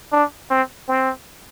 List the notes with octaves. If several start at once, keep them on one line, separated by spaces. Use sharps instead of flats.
D4
C4
C4